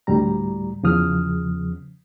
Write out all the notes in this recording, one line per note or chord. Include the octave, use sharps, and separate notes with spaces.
D2 A2 G3 A#5
E2 C#3 F3 D#6 F6